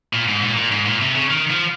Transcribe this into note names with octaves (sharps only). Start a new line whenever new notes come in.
A#2
G#2
A#2
A#2
G#2
A#2
C3
C#3
D#3
F3